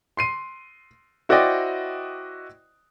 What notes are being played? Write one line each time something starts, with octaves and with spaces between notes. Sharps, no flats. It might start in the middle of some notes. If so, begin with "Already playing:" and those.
C6 C7 D#7
E4 F#4 C5 D5 D#5 G5